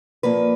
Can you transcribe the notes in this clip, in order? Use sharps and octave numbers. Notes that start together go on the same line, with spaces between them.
A#2 F3 A#3 B4